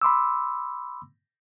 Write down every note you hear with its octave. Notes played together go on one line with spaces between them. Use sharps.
B5 C6 D6 E6